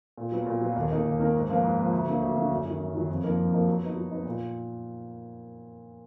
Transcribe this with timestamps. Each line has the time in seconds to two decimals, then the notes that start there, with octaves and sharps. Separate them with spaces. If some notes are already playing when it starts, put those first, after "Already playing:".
0.17 A#2
0.32 F#3 B3 F4
0.46 A#2
0.61 F#3 B3 F4
0.76 D#2
0.90 D#3 A#3 D#4 A#4
1.05 D#2
1.20 D#3 A#3 D#4 A#4
1.34 G#2
1.49 F3 A#3 F4 B4
1.63 G#2
1.77 F3 A#3 F4 B4
1.93 D2
2.07 D3 F#3 A#3
2.22 D2
2.36 D3 F#3 A#3
2.51 F#2
2.65 D#3 F#3
2.80 F#2
2.94 D#3 F#3
3.09 F2
3.24 F3 A#3 D#4 A#4
3.38 F2
3.52 F3 A#3 D#4 A#4
3.68 F#3
3.82 B3 D#4
3.96 F#3
4.11 B3 D#4
4.25 A#2